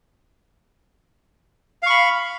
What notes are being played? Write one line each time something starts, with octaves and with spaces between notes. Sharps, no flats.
F5 B5 C#6